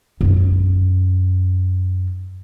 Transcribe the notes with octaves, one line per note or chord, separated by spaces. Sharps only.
F#2 D#4